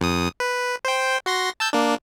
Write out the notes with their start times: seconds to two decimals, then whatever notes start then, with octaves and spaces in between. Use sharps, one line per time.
0.01 F2 D#6
0.40 B4
0.85 C5 G5
1.26 F#4 C6 A#6
1.60 A5 E6 G6
1.73 A#3 D4